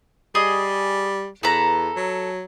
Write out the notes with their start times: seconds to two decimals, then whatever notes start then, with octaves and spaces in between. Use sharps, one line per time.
0.35 G3 G#4 D#5
1.43 E2 A4 B4 A#5
1.96 F#3